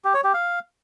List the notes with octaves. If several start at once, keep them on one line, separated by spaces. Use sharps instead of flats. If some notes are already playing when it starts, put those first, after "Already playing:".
G4
C#5
G4
F5